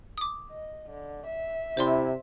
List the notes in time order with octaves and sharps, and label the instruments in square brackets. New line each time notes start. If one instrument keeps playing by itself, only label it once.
[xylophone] D6 D#6
[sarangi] D#5
D3
E5
[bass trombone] C3 [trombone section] E4 [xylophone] C5 D5 C6